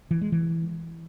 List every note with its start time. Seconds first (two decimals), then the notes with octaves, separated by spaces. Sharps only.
0.11 E3
0.21 G#3
0.32 E3